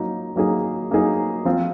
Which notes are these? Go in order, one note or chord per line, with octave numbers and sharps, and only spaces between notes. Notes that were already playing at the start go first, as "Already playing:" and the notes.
Already playing: F#3 A#3 D#4
F#3 A#3 D#4 G#4
F#3 A#3 D#4 G#4
F3 C4 F4